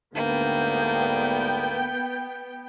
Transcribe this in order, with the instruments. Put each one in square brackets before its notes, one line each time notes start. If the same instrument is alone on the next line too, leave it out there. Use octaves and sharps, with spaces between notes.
[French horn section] D2 G#2 D3 [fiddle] A#3 [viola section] B3 G5